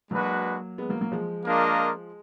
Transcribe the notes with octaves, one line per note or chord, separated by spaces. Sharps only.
F#3 G#3 A#3 D4 F#4 B4
G#3 B3
F#3 A#3
F#3 A#3
F3 G#3
A#3 D4 F4 A#4 D#5